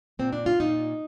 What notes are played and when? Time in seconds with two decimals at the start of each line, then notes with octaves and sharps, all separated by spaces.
0.19 A#2 C4
0.33 D4
0.46 F4
0.60 A#2 D#4